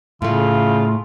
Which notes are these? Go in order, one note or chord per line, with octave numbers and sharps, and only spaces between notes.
A2 C#3 A3 F4